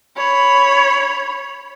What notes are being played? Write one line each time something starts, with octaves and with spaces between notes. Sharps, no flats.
C#5 B5